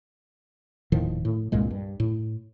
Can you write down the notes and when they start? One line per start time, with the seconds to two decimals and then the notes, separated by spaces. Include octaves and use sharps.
0.92 D#1 A2 D#3 F3
1.25 A2
1.52 C2 G2 A#2 G#3
1.71 G2
2.00 A2